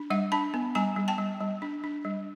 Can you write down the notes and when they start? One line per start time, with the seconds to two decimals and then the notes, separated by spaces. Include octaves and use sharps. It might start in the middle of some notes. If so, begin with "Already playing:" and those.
Already playing: D4
0.10 G3 E5 F#5
0.32 D4 A5 B5
0.54 B3
0.75 G3 G#5 A#5
0.96 G3
1.08 G5 A5
1.18 G3
1.40 G3
1.62 D4
1.84 D4
2.04 G3